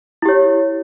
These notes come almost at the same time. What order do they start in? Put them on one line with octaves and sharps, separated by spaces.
E4 G4 C#5